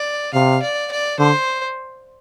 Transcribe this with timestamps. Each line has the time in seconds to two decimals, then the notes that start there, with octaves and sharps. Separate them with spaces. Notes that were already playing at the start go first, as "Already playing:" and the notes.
Already playing: D5
0.33 C3 F5
0.62 D5
0.91 D5
1.19 D3 C5